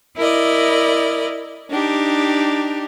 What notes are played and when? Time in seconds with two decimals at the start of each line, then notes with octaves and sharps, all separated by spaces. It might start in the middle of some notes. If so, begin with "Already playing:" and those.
0.17 E4 A#4 D5 D#5
1.70 D4 D#4 G4